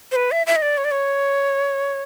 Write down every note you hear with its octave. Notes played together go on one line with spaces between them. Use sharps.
C5
B4
E5
E5
D#5
D5
C#5
D5
C#5